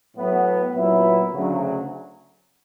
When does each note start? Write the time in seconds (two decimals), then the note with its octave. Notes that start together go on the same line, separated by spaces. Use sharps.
0.17 A2 F#3 B3
0.74 A#2 F#3 B3 E4
1.32 D2 C#3 F#3